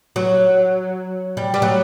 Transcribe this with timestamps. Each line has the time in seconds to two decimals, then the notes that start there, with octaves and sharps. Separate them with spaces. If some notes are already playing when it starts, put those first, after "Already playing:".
0.16 F#3
1.37 G3
1.54 G3
1.62 F#3